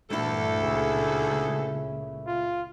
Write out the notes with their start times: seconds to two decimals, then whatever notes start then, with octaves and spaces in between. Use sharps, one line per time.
0.10 D2 G2 A#2 E3 A3 E4 A4
0.64 C#2 A#2 C#3 G#4
2.26 F4